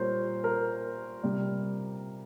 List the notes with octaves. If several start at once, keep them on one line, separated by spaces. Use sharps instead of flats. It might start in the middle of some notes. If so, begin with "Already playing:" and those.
Already playing: A#2 G3 A#4 C5 C#5
A#4
C3 G3